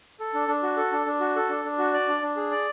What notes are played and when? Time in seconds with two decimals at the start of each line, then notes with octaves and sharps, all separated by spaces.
0.20 A4
0.34 D4
0.48 D4
0.63 F#4
0.77 A4
0.92 D4
1.06 D4
1.20 F#4
1.36 A4
1.49 D4
1.65 D4
1.78 F#4
1.93 D5
2.08 D4
2.22 D4
2.36 G#4
2.51 D5